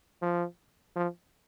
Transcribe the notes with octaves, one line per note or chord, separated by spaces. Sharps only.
F3
F3